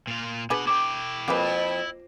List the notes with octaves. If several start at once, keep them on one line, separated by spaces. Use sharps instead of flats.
A#2 F4
B2 D4 G#4 B4 F#5
E4 G5 D6
F2 A#3 G#4 B4